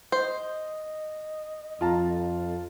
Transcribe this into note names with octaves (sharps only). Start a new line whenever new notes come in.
C5 D#5
F2 F4 A5 A#5